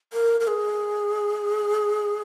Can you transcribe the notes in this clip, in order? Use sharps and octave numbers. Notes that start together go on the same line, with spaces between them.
A#4
A#4
G#4